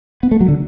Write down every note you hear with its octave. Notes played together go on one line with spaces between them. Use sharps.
B3
A3
F#3
D3